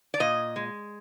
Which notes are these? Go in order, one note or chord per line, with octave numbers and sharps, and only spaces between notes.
D5
A#2 D#5
G#3